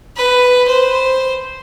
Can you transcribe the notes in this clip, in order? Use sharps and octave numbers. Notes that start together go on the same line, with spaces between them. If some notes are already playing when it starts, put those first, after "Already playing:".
B4
C5